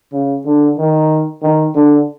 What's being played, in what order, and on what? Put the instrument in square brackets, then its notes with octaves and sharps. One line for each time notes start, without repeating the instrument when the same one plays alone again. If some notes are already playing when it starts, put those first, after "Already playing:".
[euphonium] C#3
D3
D#3
D#3
D3